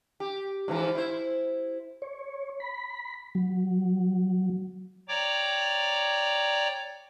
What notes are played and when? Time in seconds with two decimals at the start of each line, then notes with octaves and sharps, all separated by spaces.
0.20 G4
0.68 G#2 E3 F3
0.95 E4 C5
2.02 C#5
2.60 B5
3.35 F#3
5.08 C#5 D5 G5 A#5 D6